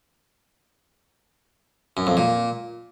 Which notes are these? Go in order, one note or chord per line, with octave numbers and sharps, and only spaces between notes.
F#2
F2
A#2